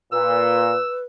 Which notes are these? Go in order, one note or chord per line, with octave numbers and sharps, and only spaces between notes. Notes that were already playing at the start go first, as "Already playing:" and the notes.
A#2 B4 E6